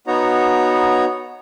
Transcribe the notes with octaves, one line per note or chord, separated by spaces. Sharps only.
B3 D#4 F#4 C#5 A#5